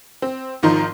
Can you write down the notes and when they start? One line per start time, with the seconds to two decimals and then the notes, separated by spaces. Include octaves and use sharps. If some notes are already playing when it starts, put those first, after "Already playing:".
0.22 C4
0.63 G#1 D#3 F3 D#4 C6